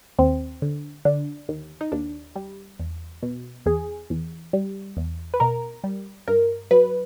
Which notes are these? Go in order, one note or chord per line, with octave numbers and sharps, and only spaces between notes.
D#2 C4
D3
D3 D4
D#2
D#4
D#2 D4
G3
E2
B2
E2 G#4
E2
G3
E2
B4
B2 A#4
G3
G2 A#4
F#3 B4